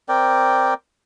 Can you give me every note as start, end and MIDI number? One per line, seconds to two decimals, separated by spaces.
0.09 0.74 60
0.09 0.74 70
0.09 0.74 74
0.09 0.74 79